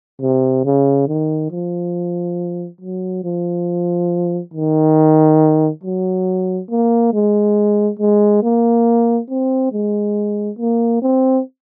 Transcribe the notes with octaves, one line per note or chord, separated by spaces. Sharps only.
C3
C#3
D#3
F3
F#3
F3
D#3
F#3
A#3
G#3
G#3
A#3
C4
G#3
A#3
C4